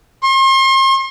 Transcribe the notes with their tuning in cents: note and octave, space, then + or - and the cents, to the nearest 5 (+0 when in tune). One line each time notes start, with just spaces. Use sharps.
C6 +40